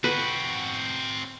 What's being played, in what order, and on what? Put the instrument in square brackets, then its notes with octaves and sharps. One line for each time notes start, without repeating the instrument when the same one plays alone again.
[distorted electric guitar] C4 F#4 [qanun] B4